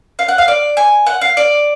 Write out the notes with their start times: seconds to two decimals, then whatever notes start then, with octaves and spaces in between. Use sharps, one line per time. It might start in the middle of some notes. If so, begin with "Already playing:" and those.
0.19 F5
0.29 F#5
0.38 F5
0.48 D5
0.77 G#5
1.06 F#5
1.21 F5
1.37 D5